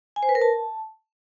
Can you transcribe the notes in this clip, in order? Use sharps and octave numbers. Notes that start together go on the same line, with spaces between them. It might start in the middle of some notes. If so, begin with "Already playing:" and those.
G#5
C5
B4
A#4
A5